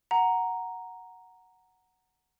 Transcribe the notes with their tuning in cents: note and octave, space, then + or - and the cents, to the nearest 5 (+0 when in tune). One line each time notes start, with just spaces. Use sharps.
F#5 +0 A#5 +0